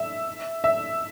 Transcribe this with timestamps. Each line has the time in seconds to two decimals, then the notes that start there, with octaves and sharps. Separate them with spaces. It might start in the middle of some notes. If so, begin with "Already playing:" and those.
Already playing: E5
0.64 E5